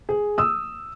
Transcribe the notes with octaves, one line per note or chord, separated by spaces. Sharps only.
G#4
D#6 E6